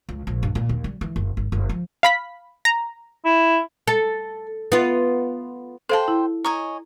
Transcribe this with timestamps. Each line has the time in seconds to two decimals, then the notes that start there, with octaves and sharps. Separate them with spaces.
0.09 C#2
0.27 A#1
0.43 G2
0.55 A#2
0.69 D#2
0.84 G3
1.01 E3
1.16 F#1
1.37 G#1
1.52 F#1
1.69 F3
2.03 F5 B5 B6
2.65 A#5
3.25 E4
3.87 A4
4.72 B3 F4
5.89 A4 C5 F5 G5 A5
6.08 E4
6.45 C#5 D#5 G#5 A#5